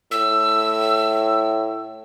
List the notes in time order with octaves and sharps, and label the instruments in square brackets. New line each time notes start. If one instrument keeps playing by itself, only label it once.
[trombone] A2 [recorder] E6